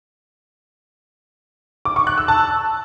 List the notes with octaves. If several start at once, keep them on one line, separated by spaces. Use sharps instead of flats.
D6
C#6
F#6
E6
A5